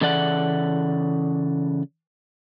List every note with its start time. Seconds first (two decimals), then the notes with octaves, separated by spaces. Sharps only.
0.01 C#3 E3 A4 D5 F#5